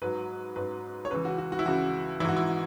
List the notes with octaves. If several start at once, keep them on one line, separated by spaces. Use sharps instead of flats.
G#2 F#3 B4
G#2 F#3 B4
C#5
C#2 C#3 E3 B4
F#4
F#4
F#4
E4
C#2 C#3 E3 F#4
G#2 E3 E4 F#4
E4